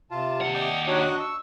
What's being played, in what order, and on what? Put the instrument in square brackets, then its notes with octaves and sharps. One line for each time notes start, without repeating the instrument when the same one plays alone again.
[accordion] C3 A5 [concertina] F4
[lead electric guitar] D#2 F#5
[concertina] D5 D#5 G5
[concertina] D4 F#4 D#5 [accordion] D#4 G4 C#5
[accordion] C#6
[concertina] E6